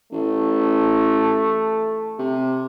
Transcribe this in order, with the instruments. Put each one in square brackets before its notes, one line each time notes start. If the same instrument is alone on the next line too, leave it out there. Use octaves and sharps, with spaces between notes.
[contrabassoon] A1 [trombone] A3
[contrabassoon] C3